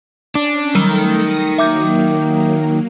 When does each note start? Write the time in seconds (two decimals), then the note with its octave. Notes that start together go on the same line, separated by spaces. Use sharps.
0.35 C#4 D4 D6
0.75 D#3 F#3 G3 A3 A4 C#7
1.15 D#6 A#6 C#7
1.58 F#3 A#3 E5 D6 G6